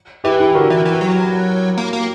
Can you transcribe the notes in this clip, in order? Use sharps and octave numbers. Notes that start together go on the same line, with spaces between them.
E3 E4 G4
E4 G4
D3 F#4 A#4
E3
E3
F#3
A#3
A#3